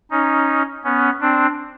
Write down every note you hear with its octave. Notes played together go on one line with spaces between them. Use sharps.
C#4 D#4
B3 C#4
C4 D4